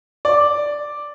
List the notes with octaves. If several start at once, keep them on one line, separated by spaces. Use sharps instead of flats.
D5